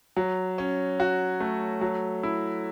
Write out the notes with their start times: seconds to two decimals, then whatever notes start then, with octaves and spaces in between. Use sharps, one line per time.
0.17 F#3
0.58 C#4
1.00 F#4
1.40 A3
1.81 F#3
2.23 E4